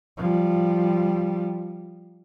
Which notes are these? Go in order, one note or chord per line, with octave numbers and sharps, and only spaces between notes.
F3 G3